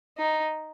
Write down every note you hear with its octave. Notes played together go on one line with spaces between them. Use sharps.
D#4